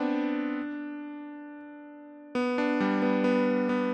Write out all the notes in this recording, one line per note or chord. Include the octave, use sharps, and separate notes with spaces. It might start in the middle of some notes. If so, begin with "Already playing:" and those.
Already playing: B3 C4 D4
B3
D4
G3
B3
B3
B3